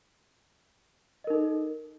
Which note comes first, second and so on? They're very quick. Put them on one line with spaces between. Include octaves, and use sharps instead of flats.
D#5 A#4 D#4 A4